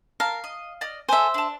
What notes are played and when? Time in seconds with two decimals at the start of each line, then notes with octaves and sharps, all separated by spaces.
0.20 A#4 F5 A5
0.44 D#5
0.81 D5 D#5 F6
1.09 A4 C5 E5 G#5
1.34 D4 A5